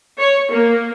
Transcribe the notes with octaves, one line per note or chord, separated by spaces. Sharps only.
C#5
A#3